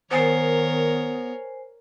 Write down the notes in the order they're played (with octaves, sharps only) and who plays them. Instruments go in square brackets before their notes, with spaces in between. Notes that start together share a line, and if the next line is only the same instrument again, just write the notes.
[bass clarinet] D#3 [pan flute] B3 [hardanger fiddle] A#4 C#5 [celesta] C5 G#5 C7